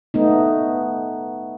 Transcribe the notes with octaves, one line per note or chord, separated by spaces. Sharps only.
A3 B3 D#4